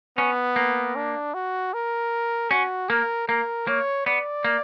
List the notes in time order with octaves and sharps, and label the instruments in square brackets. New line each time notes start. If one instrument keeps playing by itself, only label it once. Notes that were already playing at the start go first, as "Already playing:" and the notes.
[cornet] B3 [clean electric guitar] C#4
[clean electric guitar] A#3
[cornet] D4
F#4
A#4
[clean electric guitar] C#4 [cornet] F#4
[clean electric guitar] A#3 [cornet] A#4
[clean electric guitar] A#3 [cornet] A#4
[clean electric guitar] A#3 [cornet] C#5
[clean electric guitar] B3 [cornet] D5
[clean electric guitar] A#3